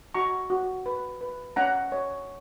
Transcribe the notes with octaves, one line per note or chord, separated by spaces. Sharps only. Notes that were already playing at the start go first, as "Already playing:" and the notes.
F#4 A#5 C#6
F#4
B4
B4
C#4 F#5 A#5
C#5